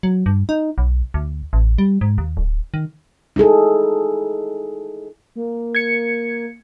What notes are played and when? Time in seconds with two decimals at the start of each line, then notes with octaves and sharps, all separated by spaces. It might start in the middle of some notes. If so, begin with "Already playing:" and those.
0.03 F#3
0.26 G2
0.49 D#4
0.78 B1
1.14 D2
1.53 A1
1.78 G3
2.01 G#2
2.18 D#2
2.37 D1
2.74 D#3
3.36 D#4 E4 G#4 A4
5.36 A#3
5.75 G#6 C#7